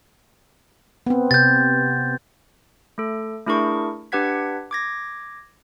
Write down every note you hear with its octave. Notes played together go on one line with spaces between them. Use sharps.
B3 C4
C3 G6 A6
A3 A4
A3 D4 E4 G#4 A#4 C#6
D4 G4 B4 F#5 G#6 B6
D6 G#6 A#6